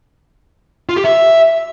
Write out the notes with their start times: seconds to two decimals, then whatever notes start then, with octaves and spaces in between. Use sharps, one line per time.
0.89 F4
0.97 G4
1.04 E5